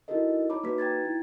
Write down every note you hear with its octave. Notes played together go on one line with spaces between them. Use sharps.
D#4 E4 F#4 A4 A#4 D#5
D#4 C#5 A#5 B5 D6
A#3 D#4 F#4 B4 B6
G5 A#5 G#6 A6
E4